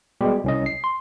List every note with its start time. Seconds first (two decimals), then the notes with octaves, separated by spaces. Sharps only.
0.21 B2 G3 G#3 G4
0.44 C2 C#4 D#5
0.66 C7
0.84 C6